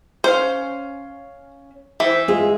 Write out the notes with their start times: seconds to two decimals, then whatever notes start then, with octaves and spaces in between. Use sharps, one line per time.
0.24 C#4 C5 F5
2.00 E3 C5 E5
2.28 G#3 F4 G#4